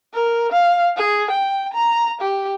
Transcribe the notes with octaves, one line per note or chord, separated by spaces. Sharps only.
A#4
F5
G#4
G5
A#5
G4